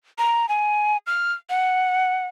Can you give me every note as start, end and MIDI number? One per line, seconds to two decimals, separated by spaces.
0.18 0.49 82
0.49 0.97 80
1.07 1.33 89
1.50 2.27 78